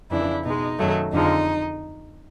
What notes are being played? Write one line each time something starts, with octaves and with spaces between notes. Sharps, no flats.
F2 C#3 E3 D4 E4
B2 G#3 D#4
F#2 D#3 F#3 A3
F2 D3 F3 G#3 D#4